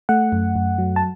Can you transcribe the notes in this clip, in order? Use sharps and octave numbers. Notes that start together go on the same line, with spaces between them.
A3 F#5
F#2
F#2
F#3
A5